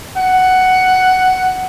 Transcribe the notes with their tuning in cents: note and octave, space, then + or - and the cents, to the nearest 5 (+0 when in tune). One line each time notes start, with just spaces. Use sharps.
F#5 +10